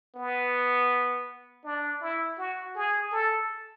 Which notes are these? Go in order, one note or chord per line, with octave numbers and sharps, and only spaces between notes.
B3
D4
E4
F#4
G#4
A4